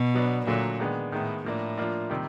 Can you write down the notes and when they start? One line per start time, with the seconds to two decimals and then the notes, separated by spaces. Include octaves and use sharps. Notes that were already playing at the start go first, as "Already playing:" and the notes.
Already playing: B2
0.15 F#3 B3 D4
0.46 A#2 D3 F#3 A3
0.80 D#3 G#3 B3 D4
1.12 A2 D#3 G#3 B3
1.45 A2 F3 A#3 D4
1.78 F3 A#3 D4 F4
2.10 C3 D#3 G3